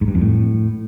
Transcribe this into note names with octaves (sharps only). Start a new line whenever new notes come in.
G#2
G2
F2
A2